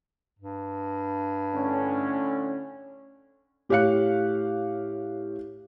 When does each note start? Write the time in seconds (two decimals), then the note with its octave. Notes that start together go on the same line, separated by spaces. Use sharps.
0.39 G2
1.54 A2 D3 C#4
3.69 A2 G4 C#5 F5 F#6 C#7